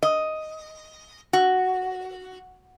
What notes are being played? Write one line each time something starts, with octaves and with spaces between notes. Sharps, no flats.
D#5
F#4